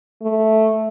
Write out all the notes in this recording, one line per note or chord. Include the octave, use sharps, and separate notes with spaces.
A3